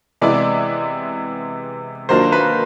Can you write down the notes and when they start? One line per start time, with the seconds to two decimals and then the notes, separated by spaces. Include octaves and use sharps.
0.22 C3 E3 G#3 B3 E4 D5
2.09 D#3 F#3 A#3 D4 F4 C5
2.32 B4